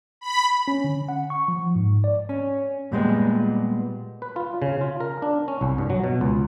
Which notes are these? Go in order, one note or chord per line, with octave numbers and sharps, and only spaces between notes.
B5
C#4
D3
F#5
C#6
F3
G#2
D5
C#4
A#2 G3 G#3 B3
B4
F4
C#3
F4
A#4
D4
C#4
C2
G2
F#3
B2
C#2